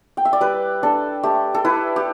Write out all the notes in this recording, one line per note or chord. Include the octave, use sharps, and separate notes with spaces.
G5
E5
D5
G3 B4
D4 A4
A3 G4
A4
E4 B4
G4